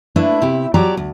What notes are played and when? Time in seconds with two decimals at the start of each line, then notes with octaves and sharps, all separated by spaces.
0.16 A3 A#3 D4 E4 B4
0.42 C3 C4 E4 G4
0.74 F3 F#3 G4 D5 A#5
0.97 D2